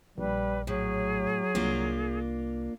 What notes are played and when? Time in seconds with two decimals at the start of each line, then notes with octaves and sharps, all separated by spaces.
0.18 A#1 G3 B4
0.67 A2 F#3 G#4
1.55 C2 A#3 D4 F4